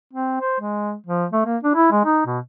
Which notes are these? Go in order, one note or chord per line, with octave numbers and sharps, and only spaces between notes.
C4
C5
G#3
F3
A3
A#3
D4
E4
G#3
D#4
B2